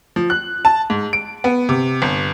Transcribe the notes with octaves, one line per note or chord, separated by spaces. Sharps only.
F3
F#6
A5
G#2
D7
B3
C3
G1